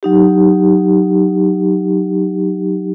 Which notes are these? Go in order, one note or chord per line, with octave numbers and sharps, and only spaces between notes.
F#3 D#4 G4